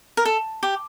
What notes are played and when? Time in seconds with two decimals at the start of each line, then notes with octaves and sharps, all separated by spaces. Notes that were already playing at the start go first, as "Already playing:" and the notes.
0.17 A#4
0.25 A4
0.63 G4